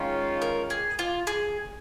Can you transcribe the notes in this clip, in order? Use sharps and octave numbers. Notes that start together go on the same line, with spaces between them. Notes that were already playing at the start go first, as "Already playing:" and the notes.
Already playing: D#3 G#3 C#4 F4
A#4
G#4
F4
G#4